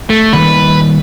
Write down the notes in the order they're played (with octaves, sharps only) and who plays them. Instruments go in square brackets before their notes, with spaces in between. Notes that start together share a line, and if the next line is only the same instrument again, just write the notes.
[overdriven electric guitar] A3
[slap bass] D#3 G3 A#3 [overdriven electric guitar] B4